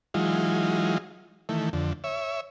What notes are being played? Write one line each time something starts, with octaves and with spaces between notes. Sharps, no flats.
E3 F#3 G#3 D#4 F4
D#3 E3 A3
F2 D3
C#5 E5